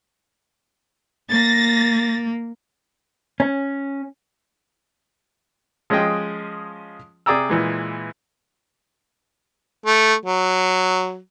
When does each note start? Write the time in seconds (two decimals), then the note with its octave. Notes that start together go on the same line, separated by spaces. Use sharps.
1.31 A#3 A6 A#6
3.40 C#4
5.90 F3 G#3 C#4 G#4 D#5 G5
7.26 C3 G#4 D5 G5 A#5 E6
7.50 A#2 E3 G#3
9.86 A3
10.26 F#3